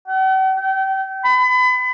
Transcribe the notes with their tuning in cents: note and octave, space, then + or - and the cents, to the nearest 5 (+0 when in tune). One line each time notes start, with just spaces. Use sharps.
F#5 +45
G5 -30
B5 +35